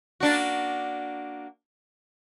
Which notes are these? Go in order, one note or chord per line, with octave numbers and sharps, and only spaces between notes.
A#3 D4 F#4